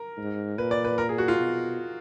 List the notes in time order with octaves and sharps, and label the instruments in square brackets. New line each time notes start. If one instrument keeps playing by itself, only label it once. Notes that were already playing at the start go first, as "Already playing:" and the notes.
Already playing: [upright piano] A#4
[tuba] G#2
[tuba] A#2 [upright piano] B4
[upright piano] D5
B4
A#4
G#4
F#4
F4
[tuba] B2